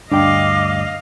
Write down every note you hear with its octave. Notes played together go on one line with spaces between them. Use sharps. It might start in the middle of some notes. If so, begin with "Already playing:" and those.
D2 G2 D4 D#5 F5 G5 D6